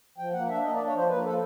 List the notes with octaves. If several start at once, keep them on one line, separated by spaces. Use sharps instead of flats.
F3 G5
A#3 F#5
D4 E5
A#3 D#5
D5
D4
C#5
F3 C5
A#3 B4
F3 A4